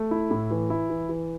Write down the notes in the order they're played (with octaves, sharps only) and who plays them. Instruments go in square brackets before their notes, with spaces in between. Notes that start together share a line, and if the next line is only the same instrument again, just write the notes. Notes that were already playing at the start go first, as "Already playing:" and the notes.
Already playing: [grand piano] A3
E4
A2
E3
E4
E3
E3